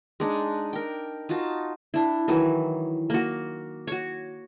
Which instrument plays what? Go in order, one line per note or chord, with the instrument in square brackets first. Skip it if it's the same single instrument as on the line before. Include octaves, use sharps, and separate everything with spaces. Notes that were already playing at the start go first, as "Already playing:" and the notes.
[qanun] G#3 D4 D#4
A#4 G5
D#4 F4 F#4 A5
D4 E4
D#3 E3 F#3
A#3 F#4
F#4 C#5